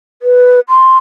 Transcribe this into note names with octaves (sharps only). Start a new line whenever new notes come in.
B4
C6